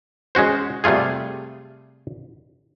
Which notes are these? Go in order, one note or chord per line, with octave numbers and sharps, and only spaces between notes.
G#3 C#4 F#4 C5
C3 G3 A3 F4 G#4